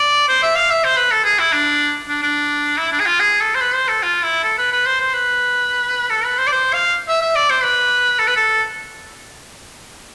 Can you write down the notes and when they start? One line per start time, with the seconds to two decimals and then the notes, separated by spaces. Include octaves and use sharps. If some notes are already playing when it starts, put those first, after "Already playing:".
Already playing: D5
0.28 C5
0.42 E5
0.55 F5
0.70 E5
0.84 C5
0.97 B4
1.11 A4
1.25 G#4
1.39 E4
1.52 D4
2.08 D4
2.23 D4
2.78 E4
2.92 D4
3.00 G#4
3.06 F4
3.19 G#4
3.41 A4
3.55 C5
3.61 B4
3.74 C5
3.88 A4
4.03 F4
4.23 E4
4.44 A4
4.58 B4
4.72 B4
4.86 C5
5.00 C5
5.13 B4
6.10 A4
6.25 B4
6.38 C5
6.47 D5
6.52 C5
6.73 F5
7.08 E5
7.21 E5
7.35 D5
7.50 C5
7.63 B4
8.19 A4
8.28 B4
8.36 A4